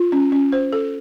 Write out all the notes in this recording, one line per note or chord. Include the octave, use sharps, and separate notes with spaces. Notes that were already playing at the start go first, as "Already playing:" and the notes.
Already playing: F4
C#4
C#4
C5
A4